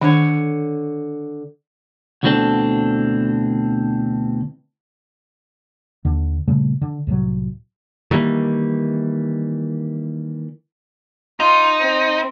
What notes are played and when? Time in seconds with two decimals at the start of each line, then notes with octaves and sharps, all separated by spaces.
0.01 D3 D#3 C#5
2.23 D2 B2 E3 C4 D4 A4
6.05 D#2 D3
6.48 A#2 C#3 G3 A3
6.81 D3
7.07 C2 A2 C3 F#3
8.11 D#3 E3 G3 A#3
11.40 D#4 F4
11.80 C4